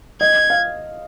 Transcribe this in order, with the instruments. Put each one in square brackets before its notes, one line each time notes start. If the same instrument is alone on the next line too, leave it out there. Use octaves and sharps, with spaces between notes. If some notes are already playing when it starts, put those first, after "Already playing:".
[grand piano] D#5 [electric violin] G#6
[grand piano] F5